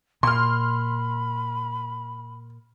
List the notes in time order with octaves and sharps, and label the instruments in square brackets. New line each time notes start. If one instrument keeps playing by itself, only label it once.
[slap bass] A#2 [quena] B5 [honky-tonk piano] C6 F6